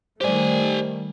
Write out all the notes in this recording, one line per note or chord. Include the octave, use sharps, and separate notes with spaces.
D#3 G3 A3 G4 C5 D5 G#5